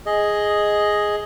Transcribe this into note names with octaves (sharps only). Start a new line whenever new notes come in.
G#4 D#5